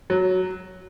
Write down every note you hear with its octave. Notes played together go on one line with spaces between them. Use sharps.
F#3